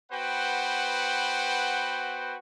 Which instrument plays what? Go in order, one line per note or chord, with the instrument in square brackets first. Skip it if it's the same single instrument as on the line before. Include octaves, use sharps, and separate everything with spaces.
[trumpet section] B3 F#4 B4 C5 F#5 G5